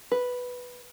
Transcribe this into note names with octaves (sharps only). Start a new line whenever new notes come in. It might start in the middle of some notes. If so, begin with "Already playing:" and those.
B4